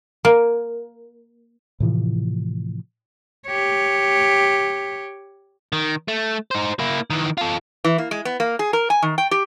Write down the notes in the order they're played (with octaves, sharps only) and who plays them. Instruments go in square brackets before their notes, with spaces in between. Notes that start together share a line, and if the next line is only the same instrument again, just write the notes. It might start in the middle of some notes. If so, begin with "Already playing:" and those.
[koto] A#3
[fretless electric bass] A2 C3 E3 F3
[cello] G4 C#5
[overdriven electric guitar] D#3
A3
D#4 C5
A#3 E4
D#3 E3
F4 A4
[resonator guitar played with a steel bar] E3
A#3
G#3
B3
A#3
G#4
A#4
G#5
D#3
G5
G4